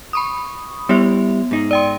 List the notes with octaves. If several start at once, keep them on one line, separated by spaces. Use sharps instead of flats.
B5 C#6 D#6
G3 B3 E4 E5
G#2 D#4
D5 G5 C6